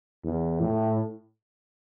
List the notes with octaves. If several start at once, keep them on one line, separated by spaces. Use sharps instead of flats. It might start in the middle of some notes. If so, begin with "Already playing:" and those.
E2
A2